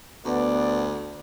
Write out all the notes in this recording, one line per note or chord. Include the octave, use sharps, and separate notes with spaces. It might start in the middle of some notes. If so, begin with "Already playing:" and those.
D2 B3 D5